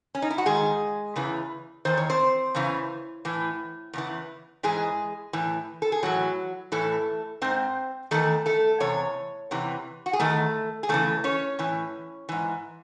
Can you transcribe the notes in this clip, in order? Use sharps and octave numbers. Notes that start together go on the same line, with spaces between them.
C#4
D#4
E4
F#4
G#2 D#3 G#3 G#4
E2 C#3 E3
E2 D#3 C5
C#5
C4 C5
E2 C#3 E3
A2 E3
E2 C#3 E3
G#2 E3 G#3 G#4
A2 E3
A4
G#4
A2 E3 F#3 F#4
A2 E3 A3 A4
G#2 D#3 C4 C5
E2 C3 D#3 A3 A4
A3 A4
E2 C3 C#5
E2 C3 E3
F#4
G#4
E2 D#3 A3 A4
G#4
E2 C#3 E3 A3 A4
C#4 C#5
A2 E3
G#2 E3